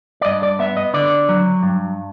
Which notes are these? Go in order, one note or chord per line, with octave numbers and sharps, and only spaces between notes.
D5
G2 D#5
D5
B3 E5
D#5
D3 D5
F#3
G2